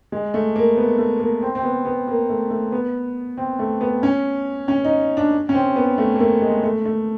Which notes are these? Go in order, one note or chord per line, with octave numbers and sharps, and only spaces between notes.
G#3
A3
A#3
B3
A3
A#3
C4
C4
B3
B3
A#3
A3
A3
B3
C4
A3
B3
C#4
C#4
D#4
D4
C#4
C4
B3
A3
A#3
A3
G#3
A3
A3